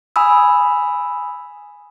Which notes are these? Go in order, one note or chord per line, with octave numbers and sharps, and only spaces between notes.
G#5 B5 D#6 E6